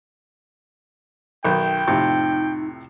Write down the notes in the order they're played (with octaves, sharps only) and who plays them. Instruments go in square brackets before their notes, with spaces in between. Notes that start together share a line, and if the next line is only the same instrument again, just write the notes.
[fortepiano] B1 D#3 [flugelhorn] G5
[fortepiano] F2 A2 C3 [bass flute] D#4